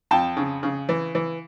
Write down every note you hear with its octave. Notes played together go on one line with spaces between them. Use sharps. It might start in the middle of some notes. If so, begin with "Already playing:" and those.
F2 G5 A5
C#3
C#3
E3
E3